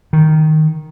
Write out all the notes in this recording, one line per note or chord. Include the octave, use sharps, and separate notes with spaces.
D#3